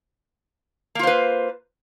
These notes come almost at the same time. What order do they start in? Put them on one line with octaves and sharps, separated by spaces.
A#3 F4 C5 B4